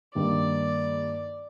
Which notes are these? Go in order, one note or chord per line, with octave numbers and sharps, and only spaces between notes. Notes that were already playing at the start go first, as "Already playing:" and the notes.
G2 D#3 A#3 D5